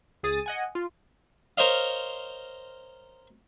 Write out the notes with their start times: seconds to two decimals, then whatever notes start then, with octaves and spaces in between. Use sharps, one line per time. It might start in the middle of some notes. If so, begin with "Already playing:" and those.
0.23 C#2 G#4 D#6 A6 D#7
0.46 D#5 F#5 G#5
0.75 F4
1.57 A#4 C5 C#5 D#5 F5